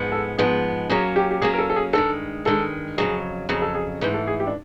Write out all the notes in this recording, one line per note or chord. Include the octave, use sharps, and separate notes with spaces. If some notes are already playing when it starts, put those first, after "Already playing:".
Already playing: G#2 F3 G#3 B3
A4
G#2 F3 G#3 B3 G#4
F#3 A#3 C#4 G#4
G4
G4
F#3 A#3 C#4 G#4
A#4
A4
A4
G#4
G2 D#3 G#3 A4
G2 D#3 G#3 A4
F2 C#3 F#3 G#4
F2 C#3 F#3 G#4
A4
G#4
G#2 E3 A3 G#4
A4
G#4
G4
D4